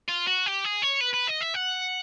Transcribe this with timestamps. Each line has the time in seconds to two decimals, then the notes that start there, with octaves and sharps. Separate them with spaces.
0.09 F4
0.27 F#4
0.46 G4
0.65 G#4
0.82 C#5
1.01 B4
1.14 B4
1.28 D#5
1.41 E5
1.55 F#5